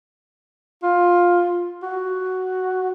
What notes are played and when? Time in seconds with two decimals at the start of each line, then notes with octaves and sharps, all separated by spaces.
0.83 F4
1.83 F#4